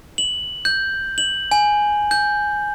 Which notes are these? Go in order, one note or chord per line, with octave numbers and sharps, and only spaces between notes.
F#7
G6
F#7
G#5
G6